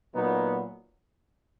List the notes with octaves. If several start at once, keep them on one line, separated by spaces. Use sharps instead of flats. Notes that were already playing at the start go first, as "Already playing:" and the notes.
A#2 F#3 B3 D#4